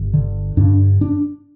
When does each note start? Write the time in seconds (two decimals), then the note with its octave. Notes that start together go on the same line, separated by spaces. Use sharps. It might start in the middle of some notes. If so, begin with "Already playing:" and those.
Already playing: G1
0.14 D3
0.57 G2 D4
1.01 D4